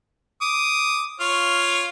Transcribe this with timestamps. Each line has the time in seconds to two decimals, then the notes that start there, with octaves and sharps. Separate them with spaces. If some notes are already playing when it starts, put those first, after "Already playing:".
0.42 D6 D#6
1.20 F4 C#5 F5